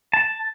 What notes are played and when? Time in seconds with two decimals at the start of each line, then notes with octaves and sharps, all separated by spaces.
0.13 A5